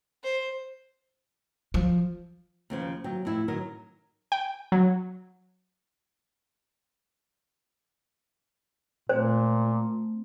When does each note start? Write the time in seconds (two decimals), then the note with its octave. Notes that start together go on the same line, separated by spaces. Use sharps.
0.24 C5
1.74 F3
2.70 D#2 C#3 F3
3.04 D#2 F#3 G5
3.25 F2 A2 E4
3.48 D#3 F#3 A#4
4.32 G5
4.72 F#3
9.09 A#2 A3 C4 C5